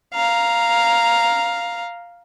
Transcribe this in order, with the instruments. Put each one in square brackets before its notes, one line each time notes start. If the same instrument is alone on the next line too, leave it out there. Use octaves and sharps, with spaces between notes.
[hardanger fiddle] F5 A#5